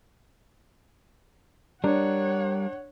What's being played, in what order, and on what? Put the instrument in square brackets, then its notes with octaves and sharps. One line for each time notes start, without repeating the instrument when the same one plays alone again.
[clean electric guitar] G3 A#4 [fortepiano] D4 [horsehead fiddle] C#5 F#5